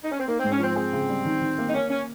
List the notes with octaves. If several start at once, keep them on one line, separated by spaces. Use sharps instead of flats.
D#4
C#4
C4
A#3 D#4
G#2 C4
C#4
F3 C4
C4 G#4
C#3
G3
D#3
D#3
A#3
D#4
A#3 C#4
C#4